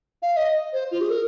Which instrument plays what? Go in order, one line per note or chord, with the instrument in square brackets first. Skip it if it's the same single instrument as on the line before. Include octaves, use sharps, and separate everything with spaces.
[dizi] F5
D#5
C5
F4
G#4
A#4